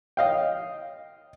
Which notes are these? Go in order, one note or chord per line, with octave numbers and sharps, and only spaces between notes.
D#5 F5 G5